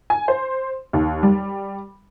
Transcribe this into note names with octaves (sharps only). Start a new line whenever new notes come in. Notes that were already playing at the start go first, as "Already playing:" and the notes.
G#5
C5
D#2
G3